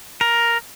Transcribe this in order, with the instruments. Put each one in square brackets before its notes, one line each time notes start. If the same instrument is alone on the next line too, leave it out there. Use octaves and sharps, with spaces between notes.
[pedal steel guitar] A#4